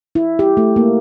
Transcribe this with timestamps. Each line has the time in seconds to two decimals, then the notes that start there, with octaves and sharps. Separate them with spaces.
0.15 E4
0.39 G4
0.57 A3
0.76 A#3